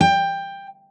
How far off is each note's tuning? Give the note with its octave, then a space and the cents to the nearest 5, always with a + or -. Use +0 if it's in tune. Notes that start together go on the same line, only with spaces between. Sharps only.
G5 +15